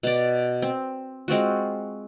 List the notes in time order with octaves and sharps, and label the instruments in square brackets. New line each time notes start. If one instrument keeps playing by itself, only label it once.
[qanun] B2 D5
C4
G#3 C4 F4 F#4